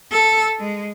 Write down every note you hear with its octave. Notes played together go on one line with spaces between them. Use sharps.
A4
G#3